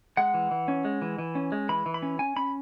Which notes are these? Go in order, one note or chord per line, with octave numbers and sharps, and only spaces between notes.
G#3 F#5
E3
E3
C#4
G#3
E3
E3
C#4
G#3
E3 B5
E3
B5
C#4
C#4 G#5
C#4 B5